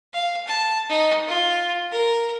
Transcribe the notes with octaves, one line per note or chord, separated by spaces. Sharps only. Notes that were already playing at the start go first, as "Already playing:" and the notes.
F5
A5
D#4
F4
A#4